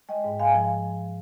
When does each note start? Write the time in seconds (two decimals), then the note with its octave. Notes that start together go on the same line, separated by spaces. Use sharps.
0.09 G#3 D#5 G5
0.24 G#2
0.39 G#2 F5 G#5
0.54 F3